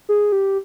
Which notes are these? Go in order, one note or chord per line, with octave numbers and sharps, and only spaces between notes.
G#4
G4